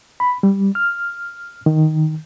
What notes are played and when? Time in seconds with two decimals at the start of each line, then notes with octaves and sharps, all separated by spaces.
0.20 B5
0.43 G3
0.75 F6
1.66 D#3